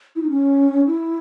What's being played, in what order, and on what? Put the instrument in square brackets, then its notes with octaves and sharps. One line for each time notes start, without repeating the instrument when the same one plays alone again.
[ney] E4
D#4
C#4
E4